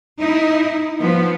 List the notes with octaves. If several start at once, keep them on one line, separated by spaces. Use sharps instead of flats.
D#4 E4
F3 B3